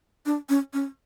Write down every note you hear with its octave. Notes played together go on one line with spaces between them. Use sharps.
D4
C#4
C#4